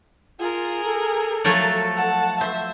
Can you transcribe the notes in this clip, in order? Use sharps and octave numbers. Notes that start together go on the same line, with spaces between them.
F4 G#4 A#4
A4
F3 F#3 A3
F#5 A5
C5 E5